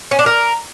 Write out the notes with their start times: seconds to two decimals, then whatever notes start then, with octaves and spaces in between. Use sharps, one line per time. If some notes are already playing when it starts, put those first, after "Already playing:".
0.11 C#4
0.19 D4
0.26 A#4